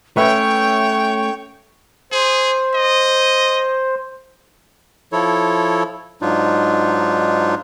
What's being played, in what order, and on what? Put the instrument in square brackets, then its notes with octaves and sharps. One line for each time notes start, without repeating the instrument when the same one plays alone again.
[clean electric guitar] A3 C#4 [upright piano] B4 E5 [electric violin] C#5 [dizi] G5
[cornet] G#4 [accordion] C5
[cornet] D#5
[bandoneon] F3 E4 A4 C#5
G#2 F#3 D4 D#4 F4